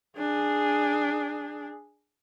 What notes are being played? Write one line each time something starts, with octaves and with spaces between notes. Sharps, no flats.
D4 G#4